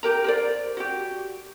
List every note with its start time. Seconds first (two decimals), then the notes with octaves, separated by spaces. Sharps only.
0.03 G4 A#4 A#5
0.24 A#4 C5 D5
0.77 F#4 G4